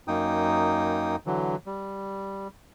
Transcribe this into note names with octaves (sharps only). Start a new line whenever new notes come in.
F#2 A#3 D#4 G5 D#6
D3 E3 F#3
G3